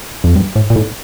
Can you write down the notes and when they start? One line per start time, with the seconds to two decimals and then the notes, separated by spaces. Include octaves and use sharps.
0.24 F2
0.35 G2
0.56 A2
0.70 A#2
0.76 A2